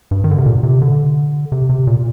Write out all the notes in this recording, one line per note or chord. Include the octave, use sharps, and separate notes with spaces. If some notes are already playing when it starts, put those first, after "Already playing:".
G2
D#3
D3
C3
A#2
C3
D3
C3
C3
A#2